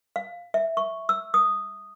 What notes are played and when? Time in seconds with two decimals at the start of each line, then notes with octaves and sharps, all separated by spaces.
0.16 F5
0.54 E5
0.77 C#6
1.09 E6
1.34 D#6